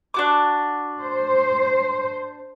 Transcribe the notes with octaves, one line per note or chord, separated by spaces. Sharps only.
D4 F#4 D6
C5